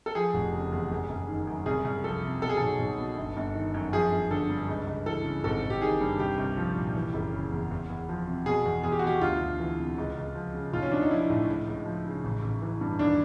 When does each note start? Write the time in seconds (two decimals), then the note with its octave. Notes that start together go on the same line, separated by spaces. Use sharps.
0.06 A4
0.15 F3 G#4
0.34 F1
0.53 C#3
0.72 E2
0.91 F#1
1.09 F#1
1.28 D#3
1.47 F#2
1.66 C2 G#4
1.85 C2
2.04 F3 A4
2.23 C3
2.42 B2 A4
2.49 G#4
2.57 B1 A4
2.80 B1
2.98 B2
3.17 G1
3.37 G1
3.55 D#3
3.74 F#2
3.93 F3 G#4
4.11 G1
4.31 D3 A4
4.50 G2
4.68 C#2
4.87 C#2
5.06 E3 A4
5.24 C#3
5.44 G#1 A4
5.63 G#1
5.70 G4
5.82 D#3 G#4
6.01 G2
6.19 C2 G4
6.38 C2
6.57 F3
6.76 A#2
6.95 E3
7.14 F#1
7.33 C#3
7.52 E2
7.71 E2
7.90 E2
8.09 F3
8.28 C3
8.46 B2 G#4
8.65 E2
8.83 E2 G#4
8.92 G4
8.99 F#4
9.03 B2 G4
9.21 D2 F4
9.40 D2
9.60 E3
9.79 C3
9.98 C#2
10.17 C#2
10.35 F3
10.54 C#3
10.73 B1 F4
10.82 C#4
10.91 B1 D4
11.01 D#4
11.11 F3 E4
11.30 A2
11.48 C#2
11.68 C#2
11.86 F3
12.05 C#3
12.24 A1
12.43 A1
12.62 E3
12.81 G2
12.99 D#2 D4